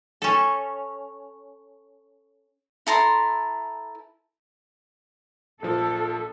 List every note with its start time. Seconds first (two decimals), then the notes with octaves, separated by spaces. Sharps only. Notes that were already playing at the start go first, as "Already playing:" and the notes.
0.22 C#4 A4
2.87 E4 A4 A#5 C6
5.63 A#1 F3 A4